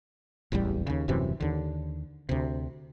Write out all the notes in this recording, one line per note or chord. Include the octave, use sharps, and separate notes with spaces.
D1 A1 E2 G3
D#2 C#3
D#1 F#2 C3 E3
D#2 D3
D2 C3